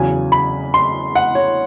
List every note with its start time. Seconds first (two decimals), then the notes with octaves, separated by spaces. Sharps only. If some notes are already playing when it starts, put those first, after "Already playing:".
Already playing: E2 C#3 F#3 G#5
0.32 B5
0.74 C6
1.15 F#5
1.35 C#5